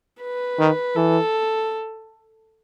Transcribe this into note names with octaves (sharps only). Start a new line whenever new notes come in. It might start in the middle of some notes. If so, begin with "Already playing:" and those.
B4
D#3
E3 A4